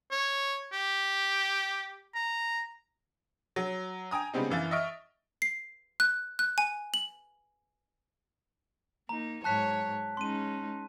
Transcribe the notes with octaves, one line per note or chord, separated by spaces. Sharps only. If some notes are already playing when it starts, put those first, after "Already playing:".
C#5
G4
A#5
F#3
G5 G#5 A#5 D#6
C#3 G3 G#3 B3 C4 D#4
F#2 E3 F5 A6
D#5 E5 C#6 F6 D7
C7
F#6
F#6
G#5
F#7
A#3 D#4 A#5
G#2 F#3 C#5 A5 F#6 B6
G#3 C#4 D#4 C6 D#7